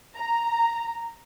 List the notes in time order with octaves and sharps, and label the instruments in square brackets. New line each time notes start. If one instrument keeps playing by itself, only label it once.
[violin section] A#5